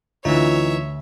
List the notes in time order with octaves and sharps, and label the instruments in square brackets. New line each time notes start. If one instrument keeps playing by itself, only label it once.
[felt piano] D2 [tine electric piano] E3 D#4 [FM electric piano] F4 [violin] C#5 E5